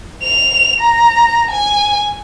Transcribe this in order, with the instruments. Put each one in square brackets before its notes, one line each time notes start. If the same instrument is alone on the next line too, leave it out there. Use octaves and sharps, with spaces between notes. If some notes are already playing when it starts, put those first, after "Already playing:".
[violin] F7
A#5
G#5